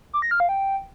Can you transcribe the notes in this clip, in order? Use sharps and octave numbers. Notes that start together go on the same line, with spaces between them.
D6
A#6
F6
F5
G5